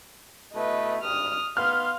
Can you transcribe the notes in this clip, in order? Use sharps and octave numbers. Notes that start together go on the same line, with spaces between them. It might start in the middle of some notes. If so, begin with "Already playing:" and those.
B2 A3 E4 B4 D#5
G#1 G2 D#6 F6
B3 D#4 B4 F5 C6 F6